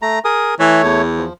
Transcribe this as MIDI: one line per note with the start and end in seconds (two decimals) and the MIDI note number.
0.02 0.19 57
0.02 0.19 82
0.25 0.55 68
0.25 0.55 70
0.25 0.55 87
0.60 0.79 52
0.60 1.02 57
0.60 1.02 73
0.84 1.25 40
1.18 1.33 53